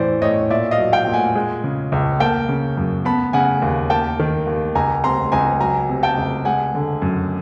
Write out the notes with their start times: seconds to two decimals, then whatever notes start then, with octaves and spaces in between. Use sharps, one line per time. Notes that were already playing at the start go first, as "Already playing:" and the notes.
Already playing: A2 E3 C5 D5
0.22 A2 C#5 D#5
0.50 A#2 D5 E5
0.71 D#5 F5
0.78 F#3
0.92 F5 G5
1.07 A#2
1.13 F#5 G#5
1.35 G#3
1.64 C#3
1.92 C#2
2.20 A#3 G5 A5
2.49 C#3
2.77 F#2
3.05 B3 A5 B5
3.33 C#3 F#5 G#5
3.62 D#2
3.90 A#3 G5 A5
4.19 D#3
4.47 D#2
4.75 C#2 G#5 A#5
5.04 C3 A#5 C6
5.32 C#2 G#5 A#5
5.60 F#3 G#5 A#5
5.89 C3
6.03 G5 A5
6.17 C#2
6.45 G#3 F#5 G#5
6.75 D3
7.02 F#2